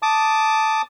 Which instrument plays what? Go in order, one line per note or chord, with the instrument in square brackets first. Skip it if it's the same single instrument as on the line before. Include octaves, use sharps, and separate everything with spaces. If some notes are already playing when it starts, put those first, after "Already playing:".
[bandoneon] A5 D6 D#6